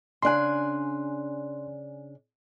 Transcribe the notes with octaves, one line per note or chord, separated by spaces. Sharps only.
C#3 D4 G#5 C6 F#6